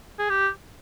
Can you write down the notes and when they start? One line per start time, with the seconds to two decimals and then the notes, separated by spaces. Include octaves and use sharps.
0.19 G#4
0.30 G4